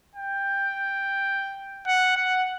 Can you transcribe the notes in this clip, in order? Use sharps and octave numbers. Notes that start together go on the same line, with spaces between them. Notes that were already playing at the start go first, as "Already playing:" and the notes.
G5
F#5
F#5